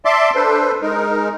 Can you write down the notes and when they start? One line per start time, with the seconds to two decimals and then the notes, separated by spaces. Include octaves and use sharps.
0.05 D5 E5 A5 C6 D6
0.35 D4 A4 B4 C5
0.82 G#3 D#4 A#4